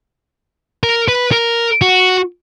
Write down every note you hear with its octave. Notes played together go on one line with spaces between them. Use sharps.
A#4
B4
A#4
F#4